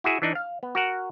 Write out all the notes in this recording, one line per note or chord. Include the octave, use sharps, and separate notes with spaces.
E4 F#4 G#4 E5
E3 D4 D#4
F5
B3
F#4 A#4 F#5